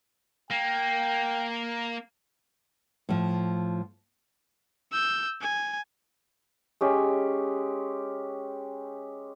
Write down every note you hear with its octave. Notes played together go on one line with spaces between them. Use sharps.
A#3 G5
A2 F3
E6 G6
G#5
G#3 C#4 G4